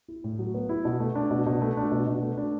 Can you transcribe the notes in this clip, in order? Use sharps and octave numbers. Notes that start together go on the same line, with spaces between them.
E4
A2
F#3
B3
E4
B2
A3
D4
B2
B2
A3
D4
B2
B2
A3
D4